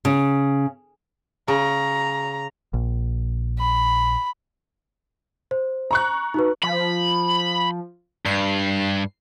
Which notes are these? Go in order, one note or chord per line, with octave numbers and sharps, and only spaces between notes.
C#3
C#3 A#5
A#1
B5
C5
A#5 C#6 F#6
D#4 F#4 B4
F3 B5
G2 C7